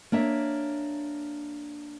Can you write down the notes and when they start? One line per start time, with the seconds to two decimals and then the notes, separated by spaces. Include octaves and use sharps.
0.12 A#3 D4 C#5 E5